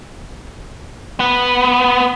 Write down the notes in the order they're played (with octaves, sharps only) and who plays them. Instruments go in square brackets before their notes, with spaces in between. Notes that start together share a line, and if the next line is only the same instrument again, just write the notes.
[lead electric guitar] B3 B4